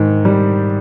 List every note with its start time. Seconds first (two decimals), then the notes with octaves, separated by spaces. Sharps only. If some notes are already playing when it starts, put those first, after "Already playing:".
Already playing: G#2 D#3
0.25 G3